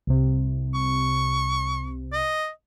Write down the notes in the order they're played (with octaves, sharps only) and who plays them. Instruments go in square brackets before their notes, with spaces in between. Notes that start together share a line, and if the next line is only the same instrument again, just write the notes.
[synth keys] C2 C3
[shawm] C#6
D#5